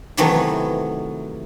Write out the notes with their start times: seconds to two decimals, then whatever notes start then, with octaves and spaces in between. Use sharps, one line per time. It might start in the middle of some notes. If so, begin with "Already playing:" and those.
0.17 C3 D#3 E3 F#3 A3 B3